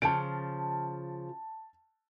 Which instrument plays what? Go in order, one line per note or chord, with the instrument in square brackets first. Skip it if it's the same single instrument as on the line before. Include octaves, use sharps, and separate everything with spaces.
[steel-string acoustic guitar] C#3 F3 [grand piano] A5 D7